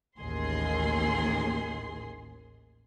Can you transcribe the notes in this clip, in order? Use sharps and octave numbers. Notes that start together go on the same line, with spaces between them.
A1 D#2 G#4 C6